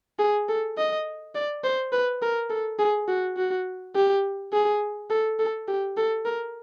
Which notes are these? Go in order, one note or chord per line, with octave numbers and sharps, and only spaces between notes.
G#4
A4
D#5
D5
C5
B4
A#4
A4
G#4
F#4
F#4
G4
G#4
A4
A4
G4
A4
A#4